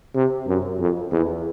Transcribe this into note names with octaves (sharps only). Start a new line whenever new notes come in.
C3
F#2
F2
E2